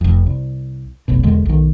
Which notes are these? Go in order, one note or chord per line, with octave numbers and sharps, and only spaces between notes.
F1 F2
C2
F1 B1 B2
E1 D3 G#3
B1 D#3